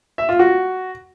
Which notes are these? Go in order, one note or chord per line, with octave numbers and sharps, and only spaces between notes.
E5
F4
F#4